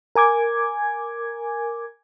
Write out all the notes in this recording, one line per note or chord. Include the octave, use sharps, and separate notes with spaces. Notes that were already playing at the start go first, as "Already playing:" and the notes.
A#4 G#5 D6 G#6